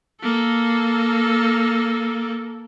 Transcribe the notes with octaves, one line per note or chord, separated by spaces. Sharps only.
A#3 A4